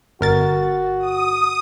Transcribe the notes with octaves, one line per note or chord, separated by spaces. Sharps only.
G1 F#4 A#4 A6
D#6